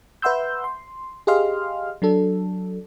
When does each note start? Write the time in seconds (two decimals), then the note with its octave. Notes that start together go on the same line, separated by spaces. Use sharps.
0.22 B4 E5 F#5 C6 E6 G6
0.64 C6
1.27 G4 G#4 D#5 F5 C6 F6
2.02 F#3 D4 A4